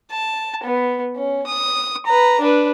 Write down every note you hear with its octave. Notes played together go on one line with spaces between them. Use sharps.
A5
B3
C#4
D#6
B4 A#5
D4 B4